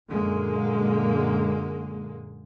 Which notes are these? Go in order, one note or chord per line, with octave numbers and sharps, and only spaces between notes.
F#2 A#2 D3 G#3 A#3